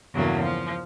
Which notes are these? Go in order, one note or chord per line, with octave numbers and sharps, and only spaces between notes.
E2 G2 C#3 F#3 A3 A#3
F3